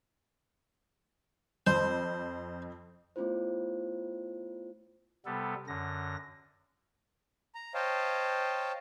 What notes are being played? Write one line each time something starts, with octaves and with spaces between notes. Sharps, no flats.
F2 C5
A3 B3 C#4 E4 F4 C5
C3 G3 B3 A4
F#2 D3 A#6
A#5
C5 C#5 D#5 F5 G5 A5